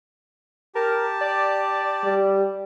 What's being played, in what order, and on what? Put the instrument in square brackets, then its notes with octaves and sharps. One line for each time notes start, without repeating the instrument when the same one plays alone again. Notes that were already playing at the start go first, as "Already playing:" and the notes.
[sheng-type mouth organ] G4 A5 [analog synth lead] A#4
[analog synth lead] D5
[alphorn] G3